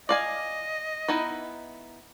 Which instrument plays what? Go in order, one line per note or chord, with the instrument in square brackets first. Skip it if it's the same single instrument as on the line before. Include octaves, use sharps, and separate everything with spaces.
[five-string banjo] D5 F5 G#5 [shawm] D#5
[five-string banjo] B3 D#4 E4